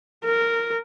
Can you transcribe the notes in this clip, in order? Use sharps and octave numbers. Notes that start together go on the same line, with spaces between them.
A#4